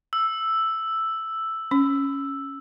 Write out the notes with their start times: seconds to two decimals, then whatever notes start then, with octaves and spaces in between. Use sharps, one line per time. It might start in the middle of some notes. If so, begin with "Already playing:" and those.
0.13 E6
1.71 C#4